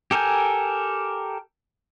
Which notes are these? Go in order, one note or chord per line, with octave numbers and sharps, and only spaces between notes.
G4 A4 A#4 G#5 G6